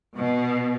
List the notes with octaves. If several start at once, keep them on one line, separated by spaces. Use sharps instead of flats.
B2